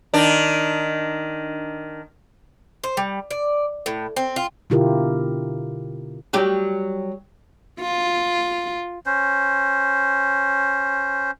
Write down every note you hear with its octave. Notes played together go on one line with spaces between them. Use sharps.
D#3 D4
C5
G3
D5
A2
C4
F4
B2 D3 E4 F4 G4 A#4
F#3 G3 G4
F4
C#4 C5